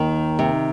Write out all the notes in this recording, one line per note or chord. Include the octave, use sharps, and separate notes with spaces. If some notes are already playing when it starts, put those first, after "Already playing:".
Already playing: D#2 D#3
C3